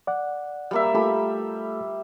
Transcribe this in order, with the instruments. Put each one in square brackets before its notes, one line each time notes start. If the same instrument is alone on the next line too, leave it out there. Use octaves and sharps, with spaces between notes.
[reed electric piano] D5 F#5
[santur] G3 A#3 E5
[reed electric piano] A3 F4 A4 [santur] G4 B5